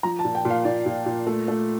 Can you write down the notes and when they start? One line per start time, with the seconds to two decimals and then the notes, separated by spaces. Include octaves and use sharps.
0.03 F3 A#5
0.19 A5
0.25 A#2
0.35 G5
0.45 A#2
0.50 F5
0.65 A#2 D5
0.86 A#2
1.06 A#2
1.27 A3
1.48 A3